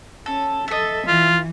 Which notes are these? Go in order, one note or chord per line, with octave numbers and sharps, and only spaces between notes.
C#4 A4
A4 D#5 E5
E3 F4